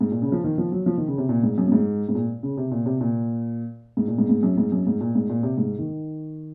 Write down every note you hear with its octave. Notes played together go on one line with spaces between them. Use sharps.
G#2
A#2
C#3
F3
D#3
F3
F#3
F3
D#3
C#3
C3
A#2
G#2
F#2
F#2
G#2
G#2
A#2
C#3
C3
A#2
C3
A#2
G#2
A#2
G#2
G#2
F#2
G#2
F#2
G#2
A#2
G#2
A#2
C3
G#2
D#3